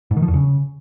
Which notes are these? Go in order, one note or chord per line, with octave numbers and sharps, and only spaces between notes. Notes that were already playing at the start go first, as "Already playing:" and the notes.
G#2
D#3
F3
E2
C#3